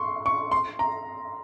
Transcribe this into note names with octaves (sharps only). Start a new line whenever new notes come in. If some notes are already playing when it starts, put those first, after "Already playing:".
Already playing: C6 C#6
C#6
C6
A#5